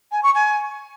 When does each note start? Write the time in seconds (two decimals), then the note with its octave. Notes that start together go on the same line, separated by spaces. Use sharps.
0.12 G#5
0.23 C#6
0.35 G#5